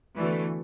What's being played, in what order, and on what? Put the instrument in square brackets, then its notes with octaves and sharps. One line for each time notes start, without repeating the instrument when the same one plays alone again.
[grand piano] D3 B3 F#4 A4 D5 [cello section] E3 A3